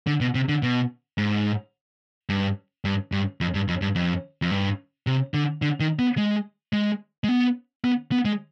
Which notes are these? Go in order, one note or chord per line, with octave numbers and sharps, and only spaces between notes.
D3
B2
C3
D3
B2
G#2
G2
G2
G2
F2
G2
F2
G2
F2
F2
G2
C3
D3
D3
D#3
B3
G#3
G#3
G#3
B3
B3
B3
G#3